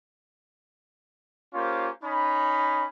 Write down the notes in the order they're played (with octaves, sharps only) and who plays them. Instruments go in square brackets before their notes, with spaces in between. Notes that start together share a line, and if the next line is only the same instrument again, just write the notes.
[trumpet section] A#3 C#4 F4 G4 C5
C#4 D#4 B5